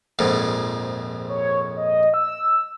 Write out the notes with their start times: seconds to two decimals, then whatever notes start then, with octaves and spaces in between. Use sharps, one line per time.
0.19 A#1 F2 G#2
1.28 C#5
1.77 D#5
2.14 E6